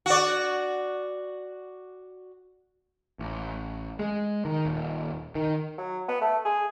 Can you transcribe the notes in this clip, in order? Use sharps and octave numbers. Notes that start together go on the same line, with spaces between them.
F#4 D5
A1
G#3
D#3
D#1
D#3
F#3
B3
A3
G#4